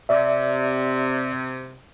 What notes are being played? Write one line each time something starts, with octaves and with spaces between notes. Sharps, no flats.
C3 D5 E5